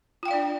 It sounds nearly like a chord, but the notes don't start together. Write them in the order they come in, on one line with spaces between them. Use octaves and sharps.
F4 G5 F5 D5 D4